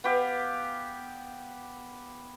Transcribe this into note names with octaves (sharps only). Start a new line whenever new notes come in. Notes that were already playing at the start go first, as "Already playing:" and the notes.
B3 G4 F5